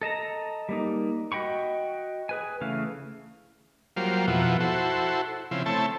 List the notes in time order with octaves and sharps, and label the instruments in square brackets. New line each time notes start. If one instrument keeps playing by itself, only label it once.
[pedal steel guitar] A4 D#5 A5 A#5
G3 A#3 D#4
F#4 D#5 G5 B5 C#6
G#4 B4 G#5
C#3 E3 A3 F5
[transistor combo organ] F#3 G3 A#3 F4 C5
F2 B2 F3 E4 F#4
E4 F#4 A4 C5
C#3 F3 C4 E4
A3 C4 E4 C#5 A5